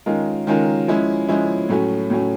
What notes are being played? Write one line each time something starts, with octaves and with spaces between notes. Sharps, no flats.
D#3 G#3 C#4 F4 A#4
D#3 G#3 C#4 F4 A#4
F3 G#3 C#4 E4
F3 G#3 C#4 E4
A2 F#3 A3 C#4
A2 F#3 A3 C#4